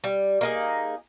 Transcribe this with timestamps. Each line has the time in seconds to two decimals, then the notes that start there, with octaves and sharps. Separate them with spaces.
0.04 G3
0.41 A#3 D#4 G#4